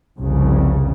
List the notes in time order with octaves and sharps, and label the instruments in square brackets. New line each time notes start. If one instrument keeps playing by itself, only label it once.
[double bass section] F1 C2 C#3